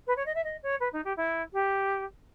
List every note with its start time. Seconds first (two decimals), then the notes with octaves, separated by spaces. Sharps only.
0.07 B4
0.17 C#5
0.26 D#5
0.35 E5
0.44 D#5
0.63 C#5
0.80 B4
0.93 D#4
1.04 G4
1.17 E4
1.53 G4